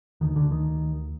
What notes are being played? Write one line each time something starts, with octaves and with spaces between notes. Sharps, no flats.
D2 D3 D#3
D3
D#3